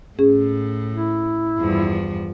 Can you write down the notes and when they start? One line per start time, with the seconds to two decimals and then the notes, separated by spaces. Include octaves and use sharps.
0.19 A2 C#4 G#4
0.94 E4
1.58 E2 G2 F3